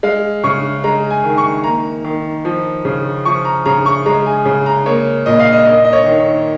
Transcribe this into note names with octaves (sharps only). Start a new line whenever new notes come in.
G#3 F5
C#3 C#6
G#3 A#5
G#5
D#3
C#6
A#3 A#5
D#3
F3
C#3
F3 C#6
A#5
C#3 A#5
C#6
G#3 A#5
G#5
C#3
A#5
A#3 C#5
A#2 D#5
F5
D#5
A#3 D#5
D#5
C#5
D#3